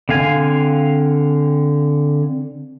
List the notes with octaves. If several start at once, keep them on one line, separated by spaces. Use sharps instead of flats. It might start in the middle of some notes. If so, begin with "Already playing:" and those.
D3 C4 F5 G#5